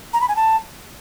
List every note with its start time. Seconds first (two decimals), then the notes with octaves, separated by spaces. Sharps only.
0.13 A#5
0.21 B5
0.29 G#5
0.36 A5